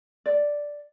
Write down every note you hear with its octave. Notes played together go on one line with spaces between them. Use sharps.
D5